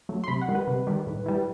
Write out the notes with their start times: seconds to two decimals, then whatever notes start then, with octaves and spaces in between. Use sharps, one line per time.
0.09 F#3 A3
0.24 C6
0.28 C3 B5
0.41 F#5
0.48 D#3 G3
0.55 B4
0.67 C3
0.87 D#3 G3
1.07 A2
1.26 E3 G3